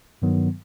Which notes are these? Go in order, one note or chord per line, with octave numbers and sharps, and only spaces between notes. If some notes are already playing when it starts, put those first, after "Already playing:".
G2 D#3 F#3 B3